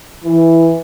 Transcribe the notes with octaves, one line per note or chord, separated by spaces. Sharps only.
E3